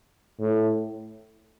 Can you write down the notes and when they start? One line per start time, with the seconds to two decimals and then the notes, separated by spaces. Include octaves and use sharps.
0.40 A2